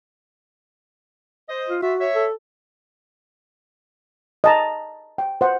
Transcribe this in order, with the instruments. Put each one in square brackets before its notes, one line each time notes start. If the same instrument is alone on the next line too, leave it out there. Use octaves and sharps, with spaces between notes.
[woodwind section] C5 D#5
[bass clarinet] F4
[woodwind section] F4 E5 [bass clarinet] F#4
[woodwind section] C#5 E5
[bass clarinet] A4
[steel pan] D#5 A5 A#5
G5
C5 F#5